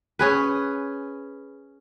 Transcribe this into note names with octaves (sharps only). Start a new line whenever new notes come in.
C#4 G#4 B4